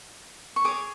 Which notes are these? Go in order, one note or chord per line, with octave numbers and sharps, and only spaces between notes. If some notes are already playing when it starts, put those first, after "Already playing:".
C#6
G#4 C#5 D6